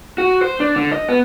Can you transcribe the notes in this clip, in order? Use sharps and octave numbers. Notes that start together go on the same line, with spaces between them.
F#4
C5
D4
D3
D#5
B3